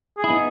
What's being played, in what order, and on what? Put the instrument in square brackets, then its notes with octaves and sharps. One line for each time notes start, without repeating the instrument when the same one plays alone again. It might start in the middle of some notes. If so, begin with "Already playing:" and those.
[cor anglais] G#4
[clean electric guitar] E4
B3 D#4